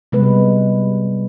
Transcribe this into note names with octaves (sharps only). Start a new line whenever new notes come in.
C3 G3 G#3 B3 B4